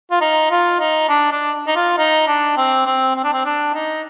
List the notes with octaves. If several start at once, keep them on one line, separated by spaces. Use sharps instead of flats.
F4
D#4
F4
D#4
D4
D4
D#4
F4
D#4
D4
C4
C4
C4
D4
C4
D4
D#4